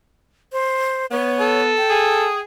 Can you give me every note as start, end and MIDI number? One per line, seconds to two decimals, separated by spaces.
0.52 1.06 72
1.11 1.73 59
1.11 1.61 73
1.41 2.25 69
1.77 2.41 79
1.90 2.41 68